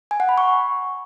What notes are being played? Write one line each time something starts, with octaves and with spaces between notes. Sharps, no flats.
G#5
F#5
B5
C#6